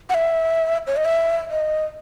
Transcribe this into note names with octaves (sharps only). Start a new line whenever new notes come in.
F#5
E5
C#5
D#5
E5
D#5